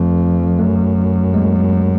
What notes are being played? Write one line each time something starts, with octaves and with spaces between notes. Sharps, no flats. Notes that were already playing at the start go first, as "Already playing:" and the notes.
Already playing: F2 A3
F#2 A3
G#3 A#3